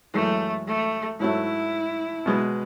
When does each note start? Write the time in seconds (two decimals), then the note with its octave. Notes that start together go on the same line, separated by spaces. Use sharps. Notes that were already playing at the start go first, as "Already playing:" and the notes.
0.13 F#2 E3 G#3 A3
0.67 A3
1.20 G#2 F#3 A3 E4
2.26 B2 G#3 B3